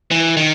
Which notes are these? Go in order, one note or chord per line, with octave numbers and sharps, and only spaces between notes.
E3
D#3